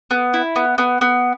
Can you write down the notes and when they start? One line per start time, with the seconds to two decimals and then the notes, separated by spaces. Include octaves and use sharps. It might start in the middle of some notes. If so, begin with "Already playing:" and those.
0.11 B3
0.34 E4
0.56 B3
0.78 B3
1.01 B3